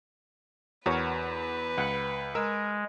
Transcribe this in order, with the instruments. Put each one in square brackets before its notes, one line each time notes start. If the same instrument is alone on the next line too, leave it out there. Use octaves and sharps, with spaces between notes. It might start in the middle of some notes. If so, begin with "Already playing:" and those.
[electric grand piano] E2 [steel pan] F#4 A#4 C#5 [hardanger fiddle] B4
[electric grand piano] C#2 [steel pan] F#5
[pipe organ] G#3 [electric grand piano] A#4 [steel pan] E6